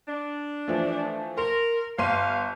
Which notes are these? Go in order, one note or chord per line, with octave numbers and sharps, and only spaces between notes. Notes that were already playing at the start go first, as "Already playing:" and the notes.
D4
E3 F3 A3
A#4 C6
G1 F5 C6 D#7